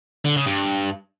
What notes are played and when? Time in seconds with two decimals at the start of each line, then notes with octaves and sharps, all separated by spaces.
0.25 D3
0.36 C#3
0.47 G2